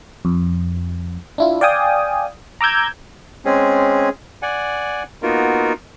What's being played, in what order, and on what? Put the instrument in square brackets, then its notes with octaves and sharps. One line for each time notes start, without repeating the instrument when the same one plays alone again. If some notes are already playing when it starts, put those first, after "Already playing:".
[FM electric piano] F2
D4 E4 F4
D5 F5 G5 G#5 D#6
A#5 D6 E6 G6 G#6
[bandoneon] G#3 C4 C#4 G#4
D5 F#5 G#5
A#3 B3 D#4 F4 F#4 A#4